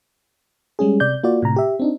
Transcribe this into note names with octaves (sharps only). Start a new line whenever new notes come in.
G3 G#3 C#4 G#4
C3 D5 G6
A#3 F4 F#4 D5
A2 C3 A#5
G4 E5
C4 D4 D#4